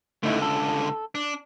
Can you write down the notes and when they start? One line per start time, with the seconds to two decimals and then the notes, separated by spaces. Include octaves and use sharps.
0.23 C#2 D3 A3 D#4 E4
0.42 A4
1.15 D4